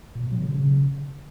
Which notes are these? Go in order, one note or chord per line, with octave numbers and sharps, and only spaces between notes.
A#2
B2
F#3
D3
C#3